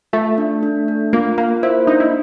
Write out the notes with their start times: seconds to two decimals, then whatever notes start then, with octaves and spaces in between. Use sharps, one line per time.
0.13 A3 F4
0.38 D4
0.63 D4
0.88 D4
1.13 A#3 F4
1.38 A#3 F4
1.63 E4 C5
1.87 D4 D#4
2.00 E4